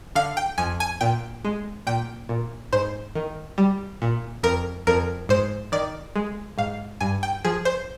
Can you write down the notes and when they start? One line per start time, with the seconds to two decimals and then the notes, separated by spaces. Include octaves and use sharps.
0.15 D3 F5
0.37 G5
0.58 F2 G#5
0.80 G#5
1.01 A#2 G5
1.45 G#3
1.87 A#2 G5
2.29 A#2
2.73 G#2 C5
3.15 D#3
3.58 G3
4.02 A#2
4.43 F2 A#4
4.87 F2 A#4
5.29 G#2 C5
5.72 D#3 D5
6.16 G#3
6.58 G#2 F5
7.01 G2 G#5
7.23 G5
7.45 F3 G#4
7.65 C5